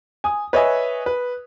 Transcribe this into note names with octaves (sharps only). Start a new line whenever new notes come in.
G#5 D#6
B4 C#5 D#5 E5 G#5
B4